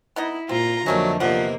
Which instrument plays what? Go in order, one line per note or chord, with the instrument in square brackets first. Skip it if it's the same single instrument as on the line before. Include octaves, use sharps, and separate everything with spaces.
[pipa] B3 D#4 D#5 [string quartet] E4
[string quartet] A#2 F4 A#5 [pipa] C4
[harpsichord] F2 D#3 [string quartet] D3 A#3 [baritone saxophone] F#3 [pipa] G3 A3 C#4
[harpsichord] E2 C3 D#3 [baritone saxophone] F3 [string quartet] A#3 [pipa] F#4 D5 F#5